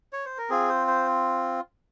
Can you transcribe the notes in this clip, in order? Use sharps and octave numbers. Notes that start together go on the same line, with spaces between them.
C#5
C5
A#4
C4 F4 G#4
C5
C5